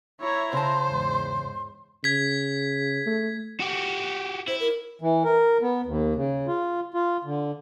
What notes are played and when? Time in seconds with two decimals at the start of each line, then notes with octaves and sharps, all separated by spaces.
0.21 E4 C#5 E5 A#5
0.53 C#3 C5 A5 C6
0.89 E2 G#2
2.04 C#3 G#6 B6
3.06 A3
3.60 F#4 G4
4.48 E4 C5
4.60 A#4
5.02 E3
5.24 A#4
5.62 B3
5.86 D#2
6.16 C#3
6.47 F4
6.94 F4
7.24 D3